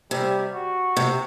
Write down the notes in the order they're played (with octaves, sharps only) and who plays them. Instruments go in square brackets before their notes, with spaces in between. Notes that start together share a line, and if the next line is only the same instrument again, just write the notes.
[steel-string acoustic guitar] C3 [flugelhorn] G3
[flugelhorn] F#4
[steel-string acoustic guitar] C3